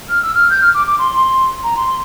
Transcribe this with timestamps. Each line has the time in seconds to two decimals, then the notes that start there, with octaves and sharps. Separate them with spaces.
0.09 F6
0.23 E6
0.34 F6
0.50 G6
0.61 F6
0.74 D6
0.87 D6
0.99 C6
1.13 C6
1.64 A#5
1.77 C6